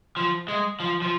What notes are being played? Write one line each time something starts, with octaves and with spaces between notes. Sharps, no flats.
F3
G#3
F3
F3